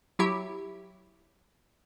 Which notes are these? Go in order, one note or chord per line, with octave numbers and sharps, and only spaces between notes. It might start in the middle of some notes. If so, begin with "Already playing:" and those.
F#3 E4 G4 E5